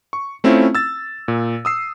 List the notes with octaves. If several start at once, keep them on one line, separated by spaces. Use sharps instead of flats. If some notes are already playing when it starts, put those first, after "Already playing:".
C#6
A3 C4 C#4 E4 F4
E6 A6
A#2
D#6 E6 C7